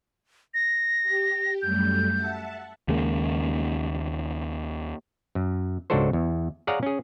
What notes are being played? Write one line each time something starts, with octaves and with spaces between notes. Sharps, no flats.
A#6
G4
F#2 G3 A3 G6
E5 F#5 A5
D#2 C#3 G#3 A#3
F#2
C#2 G#2 D4 F#4 A4 C5
E2
G#4 C#5 D5 F5 F#5 A#5
C#4 G#4